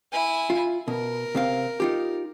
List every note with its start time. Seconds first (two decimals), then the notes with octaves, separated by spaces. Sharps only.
0.12 E4 G#5
0.50 F4
0.88 B2 A#4
1.35 C3 C4 F5
1.80 D#4 F4 G4